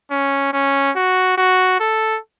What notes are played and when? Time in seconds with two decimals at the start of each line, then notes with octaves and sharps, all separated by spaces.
0.11 C#4
0.53 C#4
0.96 F#4
1.38 F#4
1.80 A4